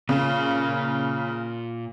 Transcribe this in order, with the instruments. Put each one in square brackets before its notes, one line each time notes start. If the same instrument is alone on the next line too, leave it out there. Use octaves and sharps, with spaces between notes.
[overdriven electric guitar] A#2 F4 [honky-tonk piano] C#3